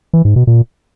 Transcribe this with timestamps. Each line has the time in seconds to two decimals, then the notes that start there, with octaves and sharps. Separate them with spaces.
0.13 E3
0.25 G#2
0.36 B2
0.47 A#2